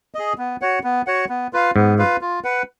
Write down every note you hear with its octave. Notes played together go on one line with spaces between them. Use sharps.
G#4 D#5
B3
F#4 C#5 F#5
B3
F#4 C#5 F#5
B3
F4 B4 F5
G#2 B3
F4 B4 F5
F4
B4 F#5